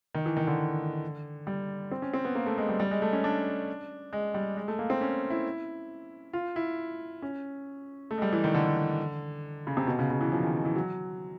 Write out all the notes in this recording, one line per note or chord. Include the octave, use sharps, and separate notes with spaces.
D#3
E3
D#3
D3
G3
C4
C#4
C4
B3
A#3
A3
G#3
G3
G3
G#3
A3
C#4
D4
G#3
G3
G#3
A3
A#3
C4
C#4
E4
F4
E4
C#4
A3
G#3
G3
E3
D#3
D3
C#3
C3
B2
C#3
C#3
E3
F3
D#3
E3
F#3